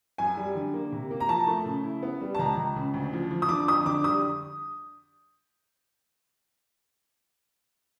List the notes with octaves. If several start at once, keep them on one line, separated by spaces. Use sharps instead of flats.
F#2 G#5
G3
D3
A#3
C3
A#3
A#5
F3 A5
A3
C#3
E4
B3
G3
A5
C#2 A#5
C#2
C#3
D2
F3
F3
D#6
D3 D6
F2 D#6
D3 D6
G3 D#6